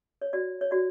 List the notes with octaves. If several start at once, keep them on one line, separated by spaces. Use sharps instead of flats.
C#5
F#4 D5
C#5
F#4 D5